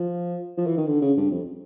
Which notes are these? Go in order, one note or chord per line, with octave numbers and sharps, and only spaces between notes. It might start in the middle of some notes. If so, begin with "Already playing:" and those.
Already playing: F3
F3
E3
D#3
D3
C#3
G2
F2